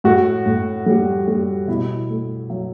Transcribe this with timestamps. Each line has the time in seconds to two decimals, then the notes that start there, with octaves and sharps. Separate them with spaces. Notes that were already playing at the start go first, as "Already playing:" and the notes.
0.04 A2 F#4
0.46 A2
0.86 G3
1.28 G3
1.68 B2 E4
2.09 A3
2.50 F#3